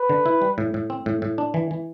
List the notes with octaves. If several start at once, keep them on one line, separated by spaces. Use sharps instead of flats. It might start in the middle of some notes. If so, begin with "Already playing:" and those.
Already playing: B4
D3
E4
G3
A2
A2
C4
A2
A2
D4
E3
E3